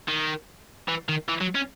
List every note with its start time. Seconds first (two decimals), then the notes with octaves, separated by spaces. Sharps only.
0.08 D#3
0.88 E3
1.09 D#3
1.29 E3
1.41 F#3
1.55 C#4